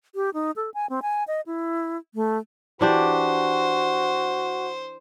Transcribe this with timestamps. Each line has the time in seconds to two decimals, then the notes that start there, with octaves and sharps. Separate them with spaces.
0.15 G4
0.34 D#4
0.56 A4
0.74 G#5
0.89 C4
1.02 G#5
1.27 D#5
1.46 E4
2.14 A3
2.81 E3 D4 F#4 G4 C5